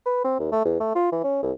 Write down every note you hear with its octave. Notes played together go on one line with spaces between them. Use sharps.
B4
C4
D#2
A3
E2
A3
F4
E3
C#4
C2